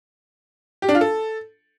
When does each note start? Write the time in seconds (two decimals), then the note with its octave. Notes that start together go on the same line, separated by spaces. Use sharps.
0.82 G4
0.89 D4
0.95 F4
1.01 A4